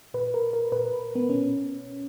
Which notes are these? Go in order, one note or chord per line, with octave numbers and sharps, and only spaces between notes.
A#2 B4
A#4
A#4
A#2 B4
B3
B2 C#4